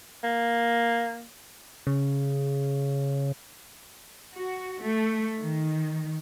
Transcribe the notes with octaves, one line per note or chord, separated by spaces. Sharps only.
A#3
C#3
F#4
A3
D#3